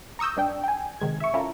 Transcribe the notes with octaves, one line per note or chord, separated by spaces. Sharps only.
A#5 C#6 D#6 E6 G6
G2 D4 G5
G5 G#5
C3 D#3 G#3 G#6
E5 C#6
C#4 E4 F4 A4 A#4